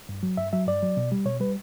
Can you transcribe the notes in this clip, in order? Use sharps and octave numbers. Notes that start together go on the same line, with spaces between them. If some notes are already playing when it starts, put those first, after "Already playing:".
G2
F#3
G2 E5
F#3 E5
G2 D5
F#3
B2
G3
B2 C#5
G3 B4